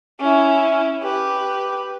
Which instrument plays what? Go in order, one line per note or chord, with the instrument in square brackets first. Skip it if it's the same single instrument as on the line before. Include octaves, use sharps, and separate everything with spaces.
[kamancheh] C#4 E4
G4 B4